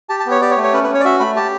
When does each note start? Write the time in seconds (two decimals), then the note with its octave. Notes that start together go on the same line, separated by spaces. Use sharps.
0.09 G4 A5
0.20 A5
0.26 B3 C#5
0.41 G4 D5
0.51 C#5
0.57 A3
0.63 C#5
0.73 C#4 B4
0.84 B4
0.89 C#4
0.95 C#5
1.00 D5
1.05 F#4 E5
1.20 A3 B5
1.36 G4 A5